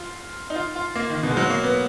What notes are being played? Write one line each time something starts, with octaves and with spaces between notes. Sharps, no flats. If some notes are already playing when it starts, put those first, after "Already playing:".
Already playing: F4
D#4
F4
F4
A#3
D#3
B2
G#3
F#3
A#3
B3